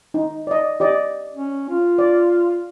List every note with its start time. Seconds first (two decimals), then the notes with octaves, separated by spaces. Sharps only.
0.14 D#4
0.47 D5 D#5
0.80 G4 D5 D#5
1.34 C#4
1.70 F4
1.99 D5